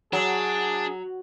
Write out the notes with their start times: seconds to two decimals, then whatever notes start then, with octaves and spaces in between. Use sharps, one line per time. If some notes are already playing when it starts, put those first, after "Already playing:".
0.13 F#3 D4 G#4